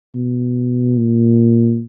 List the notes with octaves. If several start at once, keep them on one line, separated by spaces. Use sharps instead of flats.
B2
A#2